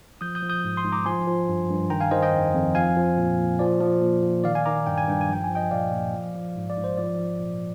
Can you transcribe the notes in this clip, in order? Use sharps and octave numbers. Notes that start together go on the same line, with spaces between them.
F3 D#6 G6
D#6 G6
F3
D#6 G6
G#2
C6 D#6
G#2
A#5 D6
F3 G#5 C6
F3
G2
G2
D#3 G5 A#5
F5 G#5
D#3 C5 D#5
D#5 G5
F2
F2
F3 F5 G#5
F3
A#2
A#2
F3 D5
F3
A#2
A#2
D#3 D5 F5
F5 G#5
D#3 A#5 D6
G2 G5
G#5
G2 G5
G#5
F3 G5
G#5
F3
D#5 G5
A#2 D5 F5
A#2
F3
F3
G#2
D5
G#2
C5
F3 D5
F3
A#2